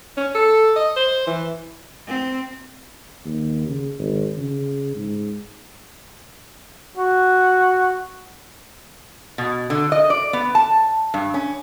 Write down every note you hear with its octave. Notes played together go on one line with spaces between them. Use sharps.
C#4
A4
D#5
C5
E3
C4
D#2
C#3
G#1
C#3
G#2
F#4
B2
D3
D#5
D5
B3
A5
G2
C#4